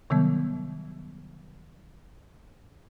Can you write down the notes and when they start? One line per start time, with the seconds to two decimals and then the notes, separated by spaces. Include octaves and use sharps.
0.10 C3 D#3 F#3 G3 B3